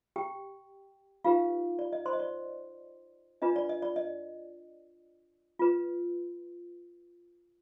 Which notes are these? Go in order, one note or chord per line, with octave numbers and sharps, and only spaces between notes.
G4 G5
D#4 F4 G4 B4 F5
D5
D#5
C5 C6
D#5
D5
D4 F4 B4 D#5
D5
D#5
D5
D#5
F4 B4